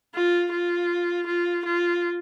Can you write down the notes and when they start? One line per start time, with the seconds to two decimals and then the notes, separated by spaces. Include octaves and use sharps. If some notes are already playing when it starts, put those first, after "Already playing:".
0.14 F4
0.52 F4
1.27 F4
1.65 F4